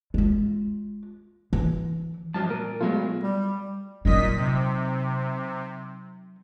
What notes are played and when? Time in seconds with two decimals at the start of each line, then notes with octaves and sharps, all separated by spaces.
0.14 G#3 F4
1.53 E3
2.34 G2 F3 F#3 A5
2.50 A#2 A#4
2.81 B2 F#3 G#3 A3 F4
3.23 G3
4.05 A#2 F#3 D#4 D#5 B6
4.36 C3